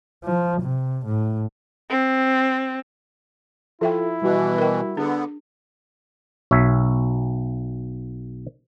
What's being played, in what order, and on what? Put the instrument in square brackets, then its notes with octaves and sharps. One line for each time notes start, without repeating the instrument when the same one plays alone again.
[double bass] F3
C3
A2
[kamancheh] C4
[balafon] F3 E5 G5 [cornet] E4 [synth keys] F4 A4
[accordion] B2 E3 [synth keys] G3 F#4
[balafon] A#4 G5
[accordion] D3 B3 [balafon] D4 G#4
[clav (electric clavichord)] B1 C#5 E5